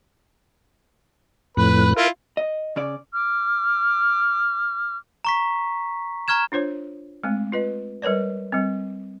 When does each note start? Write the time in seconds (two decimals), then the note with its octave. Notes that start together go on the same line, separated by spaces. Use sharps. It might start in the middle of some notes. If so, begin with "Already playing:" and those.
1.57 F2 A2 B4 F#6
1.97 E4 F4 A#4
2.37 D#5
2.76 C#3 C#4 D5
3.13 D6 F6
5.25 A#5 C#6 B6
6.28 A#5 C#6 F6 G#6 E7
6.52 D4 F4 C5 C#5
7.24 G#3 A3 C4
7.52 F4 B4 D#5
8.02 G3 A#4 B4 C#5 D5
8.52 G3 C4